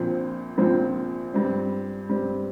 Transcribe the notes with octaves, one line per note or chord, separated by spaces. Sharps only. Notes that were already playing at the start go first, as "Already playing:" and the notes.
Already playing: A#1 A#2 F3 C4
A#1 A#2 F3 C4
G2 G3 C4
G2 G3 C4